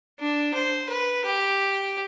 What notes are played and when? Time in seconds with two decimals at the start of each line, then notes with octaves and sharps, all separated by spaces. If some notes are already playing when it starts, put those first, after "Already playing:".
0.19 D4
0.54 C5
0.89 B4
1.25 G4